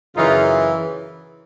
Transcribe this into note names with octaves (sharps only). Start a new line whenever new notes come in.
F#2 C#3 E3 D#4 F4